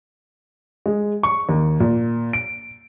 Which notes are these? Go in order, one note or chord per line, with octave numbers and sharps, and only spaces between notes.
G#3
C#6
D#2
A#2
D7